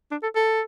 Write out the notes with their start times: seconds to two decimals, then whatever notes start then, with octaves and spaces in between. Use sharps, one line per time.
0.12 D4
0.23 A4
0.35 A4